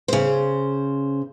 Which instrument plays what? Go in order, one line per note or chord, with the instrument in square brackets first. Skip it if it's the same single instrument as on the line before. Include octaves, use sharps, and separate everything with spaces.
[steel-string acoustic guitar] C#3 C5